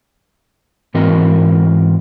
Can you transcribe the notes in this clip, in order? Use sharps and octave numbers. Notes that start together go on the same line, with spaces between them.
G#2 E3 C4 F#4 A#4 D#5